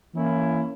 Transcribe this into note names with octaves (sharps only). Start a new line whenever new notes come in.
E3 A#3 C#4 E4